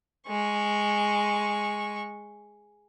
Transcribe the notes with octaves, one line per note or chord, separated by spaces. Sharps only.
G#3 C#6